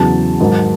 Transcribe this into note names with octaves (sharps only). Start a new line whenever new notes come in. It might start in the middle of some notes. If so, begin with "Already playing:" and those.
Already playing: E2 C#3 F#3 A5
G#2 D#3 F#3